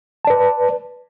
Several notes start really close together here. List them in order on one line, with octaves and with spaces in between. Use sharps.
A5 D5 B4